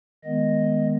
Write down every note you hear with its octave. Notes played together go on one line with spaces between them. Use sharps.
D#3 G#3 B3 D#5